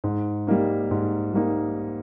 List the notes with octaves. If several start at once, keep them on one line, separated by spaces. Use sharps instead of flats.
G#2
G3 A#3 D#4
G#2
G3 A#3 D#4